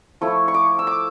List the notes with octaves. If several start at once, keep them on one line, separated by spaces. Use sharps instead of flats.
F3 A3 E4 C#6
C#6
D6
E6
D6